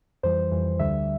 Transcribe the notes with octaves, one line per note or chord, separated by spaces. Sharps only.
F2 E3 G3 C5
F2 E3 G3
D2 D3 G3 E5